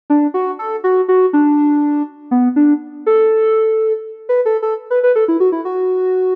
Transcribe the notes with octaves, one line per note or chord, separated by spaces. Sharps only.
D4
F#4
A4
F#4
F#4
D4
B3
D4
A4
B4
A4
A4
B4
B4
A4
E4
F#4
E4
F#4